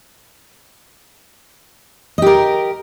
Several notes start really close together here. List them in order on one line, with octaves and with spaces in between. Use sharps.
D#5 G4 A#4